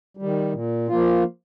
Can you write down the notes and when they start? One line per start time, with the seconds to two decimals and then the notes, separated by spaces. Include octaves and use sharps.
0.17 G3
0.22 D#3
0.52 A#2
0.88 F3 A#3 F4